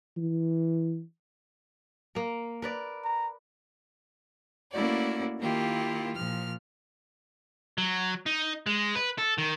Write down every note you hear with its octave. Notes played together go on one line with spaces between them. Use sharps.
E3
A#3 A#4
A#4 B4 D5
A#5
A3 A#3 C#4 E4 F#4 D5
D#3 A#3 E4 F4 G4
A#2 F3 F6
F#3
D#4
G#3
B4
A4
D#3